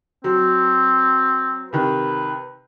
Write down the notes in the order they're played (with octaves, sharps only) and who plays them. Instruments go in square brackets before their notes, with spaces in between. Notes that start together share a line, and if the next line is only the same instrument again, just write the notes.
[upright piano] F#3 [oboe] C4
[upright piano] C3 D#3 [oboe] B4